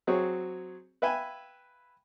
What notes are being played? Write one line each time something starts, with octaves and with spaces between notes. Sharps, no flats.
F#3 C4 G#4 C#5
B4 E5 F5 G5 G#5 B5